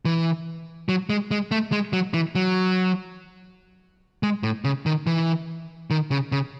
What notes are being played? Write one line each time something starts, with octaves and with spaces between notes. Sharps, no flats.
E3
F#3
G#3
G#3
A3
G#3
F#3
E3
F#3
G#3
A2
C#3
D#3
E3
D#3
C#3
C#3